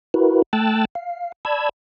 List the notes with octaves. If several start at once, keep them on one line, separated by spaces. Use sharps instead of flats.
E4 F#4 A#4 B4
A3 G5 A5 E6 F#6 A6
F5
D5 A5 B5 E6 G#6